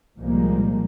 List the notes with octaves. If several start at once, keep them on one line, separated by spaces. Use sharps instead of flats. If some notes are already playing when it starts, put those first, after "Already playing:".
C2 A#2 F3 G3 G#3 A#3